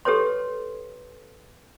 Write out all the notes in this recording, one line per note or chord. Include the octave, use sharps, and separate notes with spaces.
G4 A4 B4 C#5 C6